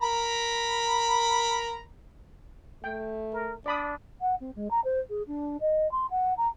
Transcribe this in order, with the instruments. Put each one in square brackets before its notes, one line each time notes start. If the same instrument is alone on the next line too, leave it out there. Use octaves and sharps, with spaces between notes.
[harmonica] A#4 A#5 B5
[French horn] A3 [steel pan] G5
[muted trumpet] A#4
[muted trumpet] D4 [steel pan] D5 B5 D#6
[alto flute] F#5
C4
G#3
A#5
C5
G#4
D4
D#5
C6
F#5
A#5